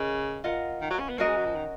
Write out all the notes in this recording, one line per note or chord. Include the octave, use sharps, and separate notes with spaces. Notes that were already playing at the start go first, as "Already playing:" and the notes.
Already playing: C#3 A#4 D#5
F4 A#4 D#5 F#5
D#3
F#3
C#4
B3
A#3 C#4 F#4 A#4 D#5
G#3
F#3
F3
D#3